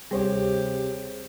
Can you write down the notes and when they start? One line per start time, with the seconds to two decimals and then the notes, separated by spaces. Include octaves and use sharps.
0.11 D2 C3 G3 G4 G#4 C5 C#5